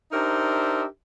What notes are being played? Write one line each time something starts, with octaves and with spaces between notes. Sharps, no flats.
D4 D#4 G4 A#4 C5 E5